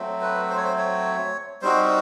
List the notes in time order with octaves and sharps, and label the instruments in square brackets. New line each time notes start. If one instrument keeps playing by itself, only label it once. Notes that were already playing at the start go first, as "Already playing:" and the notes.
Already playing: [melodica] F#3 A3 C4
B4
C5
C#5
C5
C#5
G3 C4 D#4 F#4 C5